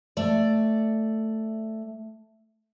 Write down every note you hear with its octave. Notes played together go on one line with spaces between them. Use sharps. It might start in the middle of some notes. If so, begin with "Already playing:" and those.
A3 D5